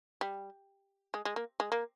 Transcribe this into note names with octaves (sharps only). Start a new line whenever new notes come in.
G3
G#3
G#3
A#3
G#3
A#3